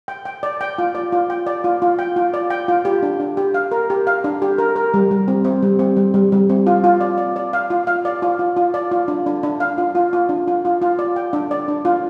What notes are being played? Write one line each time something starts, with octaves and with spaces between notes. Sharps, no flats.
G5
G5
D5
G5
F4
D5
F4
G5
D5
F4
F4
G5
F4
D5
G5
F4
G4
D4
D4
G4
F5
A#4
G4
F5
D4
G4
A#4
A#4
G3
G3
C4
C4
G3
C4
G3
G3
G3
C4
F4
F4
D5
D5
D5
F5
F4
F5
D5
F4
F4
F4
D5
F4
D4
D4
D4
F5
F4
F4
F4
D4
F4
F4
F4
D5
G5
D4
D5
D4
F4